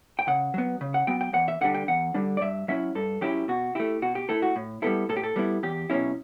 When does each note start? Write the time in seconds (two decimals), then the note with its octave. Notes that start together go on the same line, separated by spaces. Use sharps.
0.19 G5
0.27 C#3 F#5
0.54 F#3 B3
0.81 C#3
0.94 F#5
1.07 F#3 B3 G5
1.21 G5
1.34 E2 F#5
1.48 E5
1.61 D3 G3 D4 F#5
1.75 G5
1.88 E2 F#5
2.14 D3 G3 D4
2.37 D5
2.41 G2 E5
2.68 F#3 C#4 E4 E5
2.95 G2 A4
3.21 F#3 C#4 E4 G4
3.48 B2 F#4
3.75 A3 E4 G4
4.02 B2 F#4
4.15 G4
4.29 A3 E4 A4
4.42 F#4
4.56 A2
4.82 G3 B3 E4 A4
5.09 A2 A4
5.17 G4
5.24 A4
5.36 G3 B3 E4
5.63 E2 G4
5.90 B2 F#3 C#4 E4